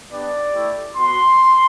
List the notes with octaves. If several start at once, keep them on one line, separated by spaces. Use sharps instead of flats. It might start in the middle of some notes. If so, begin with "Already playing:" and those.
B3 D4 G4 D5
A3 E4 G4
B3 F#4 C6